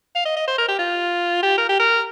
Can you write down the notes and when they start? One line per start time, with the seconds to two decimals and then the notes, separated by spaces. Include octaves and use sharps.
0.16 F5
0.26 D#5
0.36 D#5
0.48 C5
0.58 A#4
0.68 G4
0.79 F4
1.43 G4
1.58 A#4
1.69 G4
1.79 A#4